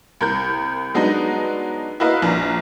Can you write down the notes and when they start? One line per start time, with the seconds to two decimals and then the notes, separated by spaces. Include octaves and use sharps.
0.21 C2 A#4 G6
0.94 F#3 G#3 B3 D4 D#4
2.00 E4 F#4 A#4 B4 D#5 F5
2.22 A#1 D4 A#5